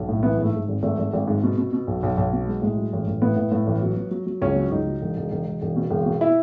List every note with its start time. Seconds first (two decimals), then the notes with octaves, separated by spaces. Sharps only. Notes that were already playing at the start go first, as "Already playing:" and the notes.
Already playing: B1
0.09 A2
0.23 E3 B3
0.38 G#2 A3
0.54 G#2
0.69 G#1
0.83 G#1 A3
0.98 G#1
1.13 G#1
1.28 G#2
1.43 B2
1.58 B2
1.73 B2
1.87 B1
2.03 B1
2.17 B1
2.33 B2
2.47 G#3
2.62 A2 G#3
2.77 F#3
2.93 A1
3.07 A1
3.22 A2 B3
3.36 A2
3.52 A2
3.67 A1
3.82 F#3
3.97 F#3
4.11 F#3
4.27 F#3
4.42 C#2 C#4
4.56 F#3
4.72 C#2 D#4
4.87 F#3
5.02 E1
5.17 E1
5.31 E1
5.46 E1
5.61 E1
5.76 B2
5.90 E1
6.06 B2
6.21 E4